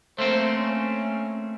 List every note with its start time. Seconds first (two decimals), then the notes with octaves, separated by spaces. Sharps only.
0.18 A3 A#3 C4 C5
0.59 C#4